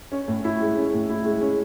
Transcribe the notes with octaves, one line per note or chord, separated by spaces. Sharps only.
C#4
A2
E4
G#3
C#4
A2
E4
G#3
C#4